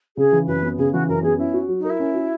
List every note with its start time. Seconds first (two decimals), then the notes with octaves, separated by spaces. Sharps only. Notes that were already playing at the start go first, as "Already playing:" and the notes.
0.17 C#3 G#4
0.32 E3
0.47 F#2 B4
0.62 B3
0.78 C#3 G#4
0.92 E3 F#4
1.08 F#2 A#4
1.23 B3 G#4
1.38 C#4 E4
1.54 F#4
1.68 F#3
1.79 D#4
1.84 A#4
1.90 E4
2.00 C#4
2.14 F#4